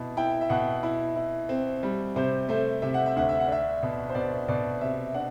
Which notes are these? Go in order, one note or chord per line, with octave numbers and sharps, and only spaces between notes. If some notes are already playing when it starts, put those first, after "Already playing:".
Already playing: B2 E4
E4 G5
E5
B2 F#5
E4
E4
C4
G3
C3 C5
A3 C5
C3 E5
F#5
E5
D2 F#5
E5
F#5
D4 E5
B2
C5
B2 D5
B2 D5
C3 E5
D4 F#5